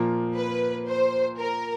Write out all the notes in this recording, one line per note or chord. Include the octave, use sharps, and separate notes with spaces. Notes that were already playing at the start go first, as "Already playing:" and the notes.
Already playing: A#2 F3 A#3
B4
C5
A#4